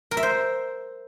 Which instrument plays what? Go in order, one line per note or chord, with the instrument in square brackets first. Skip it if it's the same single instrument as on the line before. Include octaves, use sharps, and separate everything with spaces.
[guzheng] A#4
E5
C5